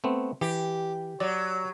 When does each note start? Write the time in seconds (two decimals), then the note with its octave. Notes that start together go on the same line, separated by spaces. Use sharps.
0.04 A3 B3 C4
0.41 E3 G4
1.20 F#3 D5